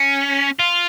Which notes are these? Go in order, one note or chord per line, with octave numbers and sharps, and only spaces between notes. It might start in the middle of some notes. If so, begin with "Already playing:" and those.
Already playing: C#4
F4